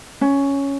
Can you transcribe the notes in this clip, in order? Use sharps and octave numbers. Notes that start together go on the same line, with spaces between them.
C#4